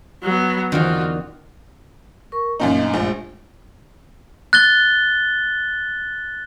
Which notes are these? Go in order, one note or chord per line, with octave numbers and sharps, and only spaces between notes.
F#3 B3
E2 D3 D#3 F4 F#4
A#4 C#6
F#2 A#2 A#3 D#4
A3 D4 D#5
A#1 G#3 F4
F#6 A6 G7